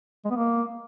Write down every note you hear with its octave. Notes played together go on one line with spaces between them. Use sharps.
G#3
B3
A#3